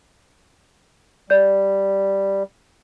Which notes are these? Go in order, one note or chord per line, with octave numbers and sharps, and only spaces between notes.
G3 D5 G6